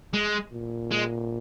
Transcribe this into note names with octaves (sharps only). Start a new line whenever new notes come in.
G#3
A#2
G#3